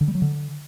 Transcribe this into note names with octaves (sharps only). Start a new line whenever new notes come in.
D3
G3
F#3
D3